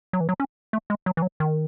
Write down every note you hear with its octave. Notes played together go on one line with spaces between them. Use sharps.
F#3
E3
F#3
C#4
A3
G#3
F#3
E3
F#3
D#3